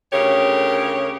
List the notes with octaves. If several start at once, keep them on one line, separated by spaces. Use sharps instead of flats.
D2 C#3 G4 A#4 C#5